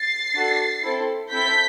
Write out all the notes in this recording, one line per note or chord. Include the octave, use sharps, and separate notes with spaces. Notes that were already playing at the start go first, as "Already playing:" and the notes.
Already playing: A6 C7
D4 F#4 A4
C4 E4 A4
C4 E4 A4 G6 B6